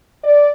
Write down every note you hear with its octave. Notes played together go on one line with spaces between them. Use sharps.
D5